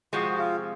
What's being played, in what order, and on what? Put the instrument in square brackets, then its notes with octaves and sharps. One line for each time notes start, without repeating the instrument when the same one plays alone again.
[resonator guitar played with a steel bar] C3 F3 G#3 C4 [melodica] F#4
[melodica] F#4
F4